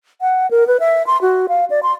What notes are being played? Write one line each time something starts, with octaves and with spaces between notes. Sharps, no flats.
F#5
A#4
B4
E5
C6
F#4
F5
D5
C6